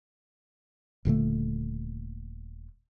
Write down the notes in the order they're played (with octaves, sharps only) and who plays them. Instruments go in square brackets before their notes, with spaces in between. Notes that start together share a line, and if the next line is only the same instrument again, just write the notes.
[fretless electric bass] D#1 A#2 D3 A3